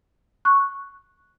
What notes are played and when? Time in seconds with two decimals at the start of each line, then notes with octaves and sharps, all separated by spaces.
0.45 C#6 F#6